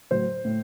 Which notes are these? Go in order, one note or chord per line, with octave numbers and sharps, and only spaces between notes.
A2 F#3 C5
A2